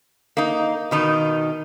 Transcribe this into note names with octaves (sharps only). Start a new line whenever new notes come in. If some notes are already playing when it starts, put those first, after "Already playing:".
A#3 D#4
B2 D#3 D#4